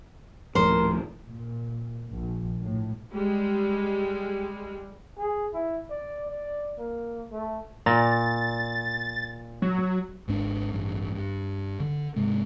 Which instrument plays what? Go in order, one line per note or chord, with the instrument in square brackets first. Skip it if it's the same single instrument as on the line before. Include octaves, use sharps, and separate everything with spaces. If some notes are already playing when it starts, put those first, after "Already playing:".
[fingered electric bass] D#1 A2 [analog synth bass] F3 [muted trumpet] A#4 [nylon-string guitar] C5
[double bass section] A#2
A#1
A2
[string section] G3 G#3
[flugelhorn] G#4
E4
D5
D5
A#3
A3
[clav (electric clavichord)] A#2 A#5 [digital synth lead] A6
[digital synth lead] F#3
[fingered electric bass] G#1 G#2 D4
A1 G2
G2
D3
G#2 C3 G#3